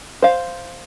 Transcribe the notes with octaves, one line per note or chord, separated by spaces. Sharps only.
C5 F5